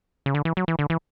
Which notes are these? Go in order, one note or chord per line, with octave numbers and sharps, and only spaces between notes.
C#3
D3
E3
F#3
E3
D3
E3